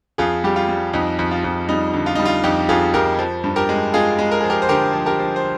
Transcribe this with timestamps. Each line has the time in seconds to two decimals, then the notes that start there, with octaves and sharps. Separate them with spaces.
0.18 F2 F4 G#4
0.44 G3 G4
0.56 F4
0.69 G3
0.93 F2 D#4
1.19 F2
1.31 F4
1.44 F2
1.69 G3 D#4
1.94 D3
2.06 F4
2.15 G3 D#4
2.25 F4
2.44 F2 D#4 G4
2.69 F2 F4 G#4
2.94 F2 G4 A#4
3.19 F3
3.44 G2
3.56 G4 A#4
3.69 G#3
3.94 G#3 F4 G#4
4.18 G#3
4.31 A#4
4.41 F3 G#4
4.50 G4 A#4
4.62 C5
4.69 D3 G4 A#4
4.93 F3
5.06 G4 A#4
5.19 F3
5.36 C5